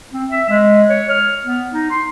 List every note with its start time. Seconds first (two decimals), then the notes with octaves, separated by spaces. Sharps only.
0.13 C4
0.31 E5
0.49 G#3
0.89 C#5
1.09 F6
1.44 B3
1.72 D#4
1.91 C6